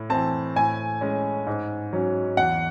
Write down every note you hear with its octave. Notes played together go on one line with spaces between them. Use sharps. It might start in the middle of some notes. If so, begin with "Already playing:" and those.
Already playing: A2
E3 C4 A5
A2 G#5
G#3 C#4
G#2
F#3 C#4
E2 F#5